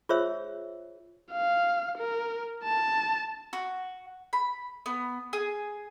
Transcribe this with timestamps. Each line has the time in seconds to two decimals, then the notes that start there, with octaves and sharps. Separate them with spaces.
0.09 F4 G#4 C5 C#5 E5 E6
1.32 F5
1.98 A#4
2.64 A5
3.53 F#4
4.33 B5
4.86 B3
5.33 G#4